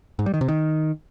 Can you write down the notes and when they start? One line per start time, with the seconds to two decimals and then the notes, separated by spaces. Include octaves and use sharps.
0.19 G#2
0.26 G3
0.34 D#3
0.41 C3
0.48 D#3